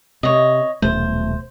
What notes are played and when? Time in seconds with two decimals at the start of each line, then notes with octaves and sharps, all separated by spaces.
0.23 C3 C#5 D#5
0.82 D#1 B1 A3 C5